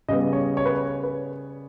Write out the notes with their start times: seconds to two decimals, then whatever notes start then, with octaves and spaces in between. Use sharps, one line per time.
0.08 C#3 G3 B3 D#5
0.33 C#5
0.57 C#5
0.66 B4
0.75 C#5
1.04 B4